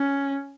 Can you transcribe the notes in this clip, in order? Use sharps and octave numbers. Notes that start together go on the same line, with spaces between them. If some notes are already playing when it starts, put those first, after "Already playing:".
Already playing: C#4